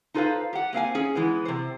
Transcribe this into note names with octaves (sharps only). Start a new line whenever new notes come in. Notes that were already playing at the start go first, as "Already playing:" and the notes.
D#4 F4 A4 B4 C5 F5
G4 F#5
A#3 C4 F5 G#5
C#4 G#4
E3 G#3 B3
C3 C5